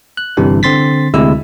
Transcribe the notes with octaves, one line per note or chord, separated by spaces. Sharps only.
F#6
G1 C3 E3 G3 D4
D3 C4 C6 A6 B6
D2 C3 G#3 E4 E6